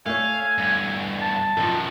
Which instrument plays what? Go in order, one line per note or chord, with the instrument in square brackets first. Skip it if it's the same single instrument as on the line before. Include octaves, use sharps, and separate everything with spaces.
[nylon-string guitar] A3 C#5 [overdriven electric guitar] F5 [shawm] G#5
[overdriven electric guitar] E2 G2
[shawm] A5
[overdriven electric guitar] F#2 D#3 [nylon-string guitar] F3 A4